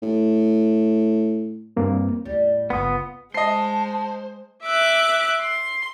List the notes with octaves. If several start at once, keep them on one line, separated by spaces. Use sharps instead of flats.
A2
G2 A#3 C4
E2 A2 G3
G1 C#2 B3 F4 D#6
G#3 C5 D#5 A5 C7
E5 D6 F#6
C6